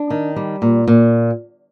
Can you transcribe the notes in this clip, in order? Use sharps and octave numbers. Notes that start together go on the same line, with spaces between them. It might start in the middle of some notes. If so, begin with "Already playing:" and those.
Already playing: D4
D#3
G3
A#2
A#2